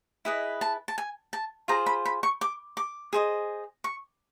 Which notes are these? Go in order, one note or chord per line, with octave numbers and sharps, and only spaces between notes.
E4 G#4 B4 D#5
A5
A5
G#5
A5
F4 G#4 C5 A#5
B5
B5
C#6
D6
D6
G#4 C5 D#5
C#6